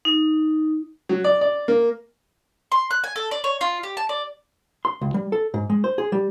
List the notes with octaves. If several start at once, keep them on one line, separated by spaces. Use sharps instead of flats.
D#4
F#3
D5
D5
A#3
C6
F#6
G#5
A4
D5
C#5
F4
G4
A5
D5
C6
C#2
G3
A4
G#2
G#3
C5
G#4
G3